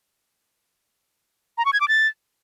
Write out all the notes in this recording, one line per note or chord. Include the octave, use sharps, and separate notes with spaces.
A#5
C#6
G#6
D6
A6